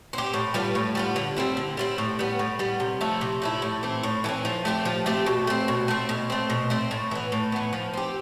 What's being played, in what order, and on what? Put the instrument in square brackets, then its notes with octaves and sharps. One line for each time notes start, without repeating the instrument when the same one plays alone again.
[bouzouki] C4 G4
A2
G3 B3 F4
A2
G3 B3 F4
D3
G3 C4 E4
D3
G3 C4 E4
A2
G3 B3
A2
G3 B3
C3
F3 A3 E4
C3
F3 A3 E4
A2
E3 A3 C4
A2
E3 A3
C4
F3
A3 C4 G4
F3
A3 C4 G4
B2
A3 C4
B2
A3 C4
B2
A3 C4
B2
A3 C4
A2
E3 B3
A2
E3 B3
F3
C4 G4